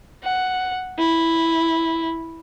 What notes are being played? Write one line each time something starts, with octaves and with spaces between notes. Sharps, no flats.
F#5
E4